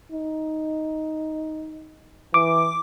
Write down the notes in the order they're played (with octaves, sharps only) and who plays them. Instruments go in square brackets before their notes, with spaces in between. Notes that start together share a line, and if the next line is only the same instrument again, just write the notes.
[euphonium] D#4
[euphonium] E3 [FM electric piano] D6